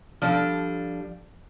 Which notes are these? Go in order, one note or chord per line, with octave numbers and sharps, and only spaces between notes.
F3 G3 D4 A4